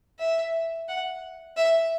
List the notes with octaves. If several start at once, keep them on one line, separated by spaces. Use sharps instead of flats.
E5
F#5
E5